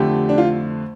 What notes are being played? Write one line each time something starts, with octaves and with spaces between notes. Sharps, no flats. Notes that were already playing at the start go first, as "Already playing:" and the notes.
Already playing: F2 D3 A3 G4
D4
F4